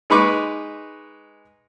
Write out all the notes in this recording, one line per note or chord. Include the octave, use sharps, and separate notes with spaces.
G#3 D#4 B4 B5 C#6 D6